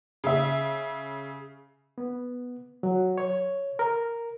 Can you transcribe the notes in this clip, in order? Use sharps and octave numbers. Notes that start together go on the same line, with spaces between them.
C#3 E5
B3
F#3
C#5
A#4